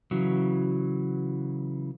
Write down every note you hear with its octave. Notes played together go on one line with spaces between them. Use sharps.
C#3 E3 F#3